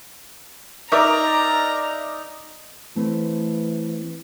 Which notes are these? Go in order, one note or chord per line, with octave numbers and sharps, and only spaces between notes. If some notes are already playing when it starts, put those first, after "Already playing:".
D#4 A#4 D5 E5 A#5 D6
E3 A3 C4 B4